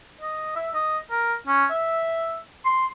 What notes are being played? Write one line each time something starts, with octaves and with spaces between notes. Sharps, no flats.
D#5
E5
D#5
A#4
C#4
E5
C6